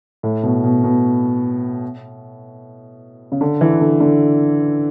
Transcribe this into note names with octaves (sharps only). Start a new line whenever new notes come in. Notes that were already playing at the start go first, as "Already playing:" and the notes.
A2
B2
B2
B2
C#3
D3
E3
D3
D3